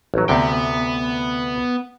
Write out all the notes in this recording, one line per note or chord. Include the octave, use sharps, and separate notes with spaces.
A1 F#3
D2 C3 B3 G5